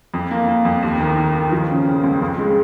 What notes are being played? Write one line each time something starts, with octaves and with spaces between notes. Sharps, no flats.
F2
A#3
A#3
F2
D#2
D#3
D#3
D#3
F3
C#3
C#3
C#2
F2
G#3